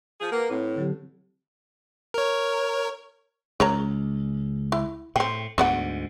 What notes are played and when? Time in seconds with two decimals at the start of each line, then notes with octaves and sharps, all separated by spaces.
0.21 F3 G#4
0.32 A#3 B4 F#5
0.50 A2 C4
0.76 D3 F#3 G4
2.14 A#4 C#5
3.60 C#2 A#4 C#5 A#5
4.72 E4
5.16 A2 C4 G5
5.58 D2 G#2 B3 D5 F#5